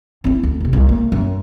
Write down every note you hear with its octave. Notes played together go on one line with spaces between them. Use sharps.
C4 E4
D2
D#2 C3
C2
A#3
F#2